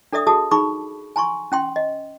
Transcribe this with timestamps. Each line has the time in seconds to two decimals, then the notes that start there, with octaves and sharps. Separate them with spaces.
0.13 D4 A4 D5 E5 D#6
0.27 F#4 G#4 A4 E5 A5 D#6
0.51 D#4 G#4 B5 C#6 D6
1.16 G#5 A#5 C6 C#6
1.52 C#4 G5 C6
1.76 D#5